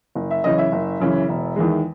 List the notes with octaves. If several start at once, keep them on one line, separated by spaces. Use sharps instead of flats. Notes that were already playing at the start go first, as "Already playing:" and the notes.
F#1
E5
F#2 C#3 E3 D#5
E5
F#1
F#2 C#3 E3
E1
E2 D#3 G#3